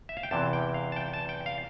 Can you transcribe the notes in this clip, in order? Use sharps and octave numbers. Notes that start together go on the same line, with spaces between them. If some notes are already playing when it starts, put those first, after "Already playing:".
E5
F5
G5
E2 C3 E3 A5
G5
F5
A5
G5
A5
G5
F5